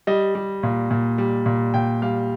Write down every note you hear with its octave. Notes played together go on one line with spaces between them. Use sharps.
G3 D#5
G3
A#2
A#2
G3
A#2
A#2 G5
G3 F5